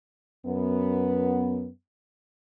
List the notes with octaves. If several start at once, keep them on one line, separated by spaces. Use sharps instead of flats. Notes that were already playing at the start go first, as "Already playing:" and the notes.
F#2 B3